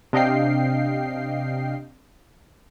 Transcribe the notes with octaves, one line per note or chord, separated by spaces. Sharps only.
C3 D4 D#5 F5 G5 C7